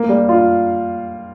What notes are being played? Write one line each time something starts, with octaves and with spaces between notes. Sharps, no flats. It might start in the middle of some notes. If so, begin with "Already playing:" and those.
Already playing: A#3
G3
F4